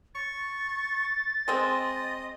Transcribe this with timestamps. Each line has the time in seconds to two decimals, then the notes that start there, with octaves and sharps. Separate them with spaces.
0.15 C#6 A6
1.48 G#3 C4 D#5